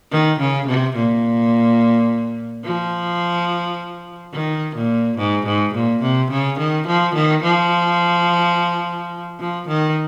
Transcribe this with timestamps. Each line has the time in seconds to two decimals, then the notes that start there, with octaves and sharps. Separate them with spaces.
0.11 D#3
0.39 C#3
0.67 C3
0.96 A#2
2.64 F3
4.33 D#3
4.75 A#2
5.18 G#2
5.46 G#2
5.74 A#2
6.02 C3
6.31 C#3
6.59 D#3
6.87 F3
7.15 D#3
7.43 F3
9.40 F3
9.68 D#3